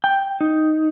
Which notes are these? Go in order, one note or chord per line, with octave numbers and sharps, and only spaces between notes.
G5
D#4